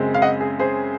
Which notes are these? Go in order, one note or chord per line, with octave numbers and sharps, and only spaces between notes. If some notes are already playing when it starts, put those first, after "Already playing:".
Already playing: F#2 C#3 G#3 C4
F5
D#5 F#5
G#4
G#4 C5